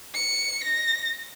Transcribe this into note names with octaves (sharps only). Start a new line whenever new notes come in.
C#7
A#6